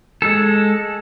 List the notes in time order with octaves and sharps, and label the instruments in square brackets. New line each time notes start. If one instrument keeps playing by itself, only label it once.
[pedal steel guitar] G#3 A4